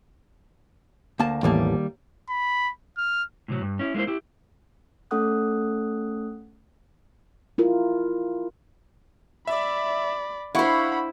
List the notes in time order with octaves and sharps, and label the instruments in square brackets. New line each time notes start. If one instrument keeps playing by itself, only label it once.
[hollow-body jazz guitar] D2 A#3 A5
[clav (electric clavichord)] A1 E2 A5 [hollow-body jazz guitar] D#3 G3 A#3
[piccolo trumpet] B5
F6
[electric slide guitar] A2 C3 F#3
G2
C#4 E4
G#3 A#3 C4 E4 C5
E4 G4
[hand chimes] A3 C#4 A4 F#5 D#6 F#6
[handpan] E4 F4 A#4
[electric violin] D5 B5 [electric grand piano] E5
[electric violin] D4 B5 [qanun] E4 C5 [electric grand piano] F5 F#5 C#6